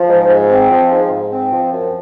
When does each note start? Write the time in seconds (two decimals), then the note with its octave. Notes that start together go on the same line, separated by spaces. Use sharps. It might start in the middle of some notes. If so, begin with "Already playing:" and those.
Already playing: F3
0.08 G#2
0.29 G#2
0.49 C4
0.70 F3
0.91 G#2
1.11 G#2
1.31 C4
1.52 F3
1.72 F#2